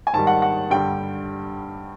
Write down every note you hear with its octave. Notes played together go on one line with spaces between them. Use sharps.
G#5
G#2 D#3 G3 A5
F#5
F#5
G2 D3 G3 G5